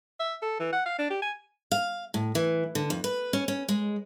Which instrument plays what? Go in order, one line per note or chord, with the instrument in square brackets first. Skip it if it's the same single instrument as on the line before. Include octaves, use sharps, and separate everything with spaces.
[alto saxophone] E5
A4
E3
F#5
F5
D4
G4
G#5
[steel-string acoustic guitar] F5
A2
E3
D3
F2
B4
C#4
C#4
G#3